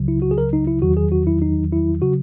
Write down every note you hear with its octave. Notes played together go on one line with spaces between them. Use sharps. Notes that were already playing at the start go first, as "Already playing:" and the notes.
Already playing: C#2 C#3 F#3
E4
F#4
G#4
A#4
D#4
E4
E2 D#3 F#3 F#4
G#4
F#4
E4
D#4
E4
C#3 F#3 F#4